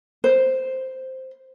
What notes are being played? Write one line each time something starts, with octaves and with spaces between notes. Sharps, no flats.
C5